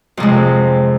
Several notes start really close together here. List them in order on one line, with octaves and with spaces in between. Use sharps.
F2 C3 G#3